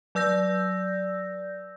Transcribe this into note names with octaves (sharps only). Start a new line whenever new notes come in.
F#3 D5 E6 G6 A#6